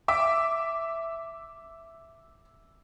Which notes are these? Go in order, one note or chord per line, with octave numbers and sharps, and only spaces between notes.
E5 D6